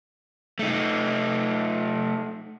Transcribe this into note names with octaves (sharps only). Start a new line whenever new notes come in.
A3 D#4